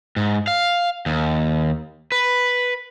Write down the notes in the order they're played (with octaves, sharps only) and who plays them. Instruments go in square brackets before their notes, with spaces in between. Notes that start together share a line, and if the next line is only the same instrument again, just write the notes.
[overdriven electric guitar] G#2
F5
D#2
B4